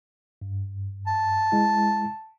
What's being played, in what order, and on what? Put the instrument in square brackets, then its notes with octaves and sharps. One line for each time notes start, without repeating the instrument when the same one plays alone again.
[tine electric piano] G2
[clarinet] A5
[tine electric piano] G#3 E4